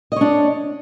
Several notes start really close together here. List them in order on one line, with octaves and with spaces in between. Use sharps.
D#5 C#5 D4